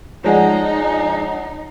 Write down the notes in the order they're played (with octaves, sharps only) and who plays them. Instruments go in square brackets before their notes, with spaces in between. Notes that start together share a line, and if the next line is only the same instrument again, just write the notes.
[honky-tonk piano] F3 G#3 [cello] D#4 [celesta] C#5 D5 F#5